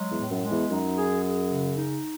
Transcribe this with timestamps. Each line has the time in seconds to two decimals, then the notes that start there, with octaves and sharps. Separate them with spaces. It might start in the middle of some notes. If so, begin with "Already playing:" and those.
Already playing: F#3 G#3
0.11 E2
0.18 A2
0.31 F#2
0.44 G#3
0.51 E2
0.70 F#2 D#4
0.97 G#4
1.24 G#4
1.50 C#3
1.77 D#4